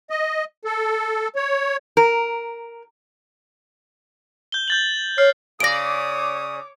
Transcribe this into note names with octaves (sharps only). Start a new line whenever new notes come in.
D#5
A4
C#5
A#4
G6 G7
G6 A6 F#7
C#5 F6 C7
C#3 C#5 D5 D6 D#6 A#6 D7